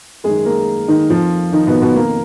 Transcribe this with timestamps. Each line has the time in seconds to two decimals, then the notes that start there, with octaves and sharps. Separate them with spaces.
0.24 F#2 D#3 G#3 G#4
0.45 A#3 A#4
0.88 D#3 D#4
1.09 F2 D#3 F3 F4
1.52 D#3 D#4
1.67 B2 B3
1.82 B2 B3
1.95 F2 D#3 A#3